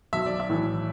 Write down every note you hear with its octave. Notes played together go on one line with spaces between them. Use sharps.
B1 E5
D5
E5
A2 E3